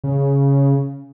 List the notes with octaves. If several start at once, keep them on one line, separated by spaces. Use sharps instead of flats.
C#3